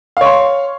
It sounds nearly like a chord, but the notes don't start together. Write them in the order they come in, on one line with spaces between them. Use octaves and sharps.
F5 C#5 C6